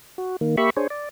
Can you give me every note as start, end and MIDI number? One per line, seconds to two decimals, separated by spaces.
0.18 0.36 66
0.41 0.56 51
0.41 0.56 58
0.57 0.70 58
0.57 0.70 67
0.57 0.70 76
0.57 0.70 83
0.57 0.70 85
0.77 0.87 62
0.77 0.87 68
0.77 0.87 72
0.77 0.87 73
0.90 1.09 74